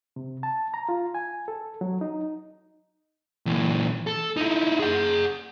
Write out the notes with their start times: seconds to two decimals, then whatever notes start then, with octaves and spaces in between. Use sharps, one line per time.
0.16 C3
0.43 A5
0.74 A#5
0.89 F4
1.15 G#5
1.48 A4
1.81 F#3
2.01 D#4
3.46 A#2 E3
4.07 A4
4.37 D#4 E4
4.80 G#4 F#5